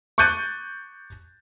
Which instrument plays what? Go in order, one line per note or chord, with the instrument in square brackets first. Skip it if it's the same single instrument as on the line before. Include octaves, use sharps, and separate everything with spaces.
[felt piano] C#6 D6 F#6 G6 A6 D#7